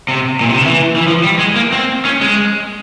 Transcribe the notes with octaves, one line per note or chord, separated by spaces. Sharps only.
C3
A#2
C3
C#3
E3
E3
F3
G3
G#3
A#3
C4
C#4
G#3